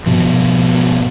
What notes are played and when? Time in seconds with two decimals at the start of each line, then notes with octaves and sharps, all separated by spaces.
0.06 G#2 B2 F3